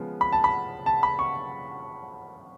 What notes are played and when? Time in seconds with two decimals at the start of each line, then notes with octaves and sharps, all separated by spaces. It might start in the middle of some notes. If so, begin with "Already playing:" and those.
Already playing: C#3 F3 G#3 B3
0.21 B5
0.32 A5
0.44 B5
0.86 A5
1.03 B5
1.19 C#6